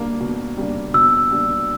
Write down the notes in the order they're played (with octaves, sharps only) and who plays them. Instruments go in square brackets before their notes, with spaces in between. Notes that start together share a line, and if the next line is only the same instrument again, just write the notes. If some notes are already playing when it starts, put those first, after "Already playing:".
Already playing: [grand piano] B2 G3 A#3 D4
B2
G3 A#3 D4
[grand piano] B2 [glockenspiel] E6
[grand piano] G3 A#3 D4